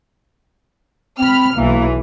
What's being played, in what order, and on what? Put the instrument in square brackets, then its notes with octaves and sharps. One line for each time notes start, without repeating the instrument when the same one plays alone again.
[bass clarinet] C4 [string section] B5 F6
[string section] B1 E3 [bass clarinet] A#3